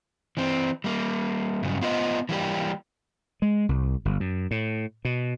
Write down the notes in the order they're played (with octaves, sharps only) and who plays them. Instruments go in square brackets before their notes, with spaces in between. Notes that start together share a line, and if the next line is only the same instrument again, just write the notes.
[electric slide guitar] E3 C4
G3 A#3
G2 C#3 F#3
B3 F4 B4 D#5
E3 G3 A#3 G4
[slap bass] G#3
C2
G1
F#2
A2
B2